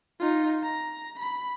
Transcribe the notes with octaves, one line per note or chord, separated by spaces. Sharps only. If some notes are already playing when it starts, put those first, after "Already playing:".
D#4 F4
A#5
B5